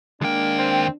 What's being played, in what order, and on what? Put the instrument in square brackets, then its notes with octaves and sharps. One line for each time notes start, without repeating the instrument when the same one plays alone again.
[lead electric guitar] D#2 G5 [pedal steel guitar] G#3 A#3 [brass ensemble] D4
[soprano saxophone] C4